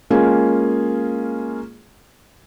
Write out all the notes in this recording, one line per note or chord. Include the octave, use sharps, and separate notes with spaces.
G#3 A#3 C#4 F4 G#4